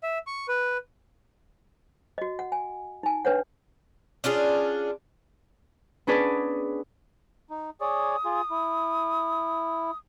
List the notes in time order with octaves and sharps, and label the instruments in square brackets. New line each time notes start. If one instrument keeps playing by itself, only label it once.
[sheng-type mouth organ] E5
C#6
B4
[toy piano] F#4 D#5
F#5
G#5
D#4 G#5
D4 B4 C#5 F#5
[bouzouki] C#4 D4 F4 G#4
[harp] B3 C#4 D4 G#4 B4 D5
[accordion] D#4
[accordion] G#4 C#5 D5 [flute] D#6
[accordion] F4 G#4
E4